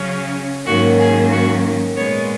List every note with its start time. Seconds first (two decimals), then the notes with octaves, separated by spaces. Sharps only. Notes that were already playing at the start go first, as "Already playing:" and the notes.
Already playing: C#3 F#3 C#4
0.66 G#2 D#3 F#3 A#3 C#4 F#4
0.99 G#4
1.31 F#4
1.96 A#2 G#3 B3 C#5